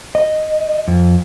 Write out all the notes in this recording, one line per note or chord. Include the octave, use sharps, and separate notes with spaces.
D#5
F2